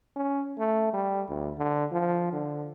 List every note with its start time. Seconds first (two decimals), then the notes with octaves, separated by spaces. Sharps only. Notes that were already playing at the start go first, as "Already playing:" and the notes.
0.16 C#4
0.58 A3
0.93 G3
1.29 D2
1.58 D3
1.92 F3
2.33 D3